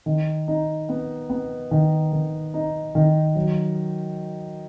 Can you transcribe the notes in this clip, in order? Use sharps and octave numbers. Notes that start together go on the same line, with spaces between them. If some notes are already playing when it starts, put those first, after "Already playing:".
D#3
D#4
B3
B3
D#3
D#3
D#4
D#3
F#3